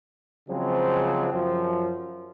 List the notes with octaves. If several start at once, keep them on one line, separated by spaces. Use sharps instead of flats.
C#3 F3 F#3 G#3 C4
F#2 F3